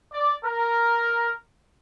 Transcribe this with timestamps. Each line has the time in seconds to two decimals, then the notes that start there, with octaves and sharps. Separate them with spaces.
0.12 D5
0.44 A#4